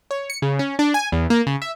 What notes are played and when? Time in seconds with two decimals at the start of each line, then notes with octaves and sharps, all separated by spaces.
0.11 C#5
0.30 C#7
0.42 C#3
0.59 C#4
0.79 D4
0.94 G#5
1.12 E2
1.30 A#3
1.47 C#3
1.62 E5